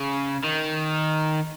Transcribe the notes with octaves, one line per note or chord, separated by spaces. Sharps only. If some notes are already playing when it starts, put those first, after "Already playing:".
Already playing: C#3
D#3